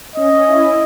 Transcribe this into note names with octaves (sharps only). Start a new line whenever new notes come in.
C#4 D#5
C#4
E4